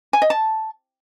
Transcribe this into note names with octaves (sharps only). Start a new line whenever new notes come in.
G#5
D#5
A5